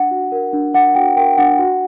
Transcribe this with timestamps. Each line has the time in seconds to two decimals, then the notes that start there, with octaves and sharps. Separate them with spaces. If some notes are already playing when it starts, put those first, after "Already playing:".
Already playing: D4 F#5
0.11 F#4
0.32 A#4
0.53 D4
0.74 D4 F#5
0.95 F#4 G5
1.16 A#4 G5
1.37 D4 F#5
1.59 F#4